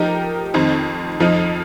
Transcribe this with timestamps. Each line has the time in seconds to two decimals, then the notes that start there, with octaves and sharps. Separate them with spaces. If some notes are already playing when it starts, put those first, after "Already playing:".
Already playing: F3 D#4 G4 A#4
0.54 F2 D#3 C4 D#4
1.20 F2 F3 D#4